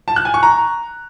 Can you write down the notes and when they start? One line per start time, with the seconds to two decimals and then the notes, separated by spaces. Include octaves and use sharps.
0.08 A5
0.16 F#6
0.25 G#5
0.34 C#6
0.43 A#5